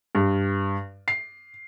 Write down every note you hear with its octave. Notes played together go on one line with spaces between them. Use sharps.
G2
C7